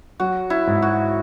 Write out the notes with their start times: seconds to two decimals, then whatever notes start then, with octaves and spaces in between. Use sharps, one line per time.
0.20 F#3 F#4
0.50 E4
0.67 G#2
0.82 F#4